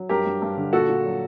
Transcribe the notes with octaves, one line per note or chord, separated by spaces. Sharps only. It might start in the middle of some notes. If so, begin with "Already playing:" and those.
Already playing: F#3
G2 G4 A#4
G2
G2
D3
A#2 F#4 A4
A#2
F#3